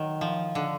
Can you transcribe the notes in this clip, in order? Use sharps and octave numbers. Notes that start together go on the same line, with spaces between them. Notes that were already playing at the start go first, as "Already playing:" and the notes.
Already playing: D#3 F#3
F3
D3